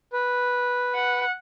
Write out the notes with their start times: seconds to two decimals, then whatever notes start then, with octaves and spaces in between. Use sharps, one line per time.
0.13 B4
0.95 F#5